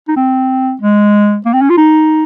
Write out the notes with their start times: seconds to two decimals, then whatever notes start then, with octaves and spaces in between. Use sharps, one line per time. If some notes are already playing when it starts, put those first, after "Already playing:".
0.08 D#4
0.16 C4
0.81 G#3
1.46 A#3
1.54 C4
1.61 C#4
1.70 F4
1.78 D#4